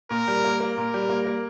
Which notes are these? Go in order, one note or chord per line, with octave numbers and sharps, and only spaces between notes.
A#2 A#4
G3
A#3
A#3
A#2 A#4
G3
A#3
A#3